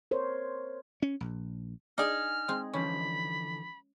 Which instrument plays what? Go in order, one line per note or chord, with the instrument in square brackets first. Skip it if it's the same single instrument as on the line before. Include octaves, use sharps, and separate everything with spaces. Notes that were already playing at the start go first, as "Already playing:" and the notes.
[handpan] A#4 C5 C#5
[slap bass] C#4
A#1
[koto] D4 D5 [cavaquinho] D#4 G#4 G#5 [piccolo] F6
[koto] G#3 C4
[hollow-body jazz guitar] D3 E3 F3 [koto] C#4 [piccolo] B5